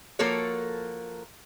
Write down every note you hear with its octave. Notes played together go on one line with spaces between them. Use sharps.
F3 A#3 F#4 A4 A#4 C#5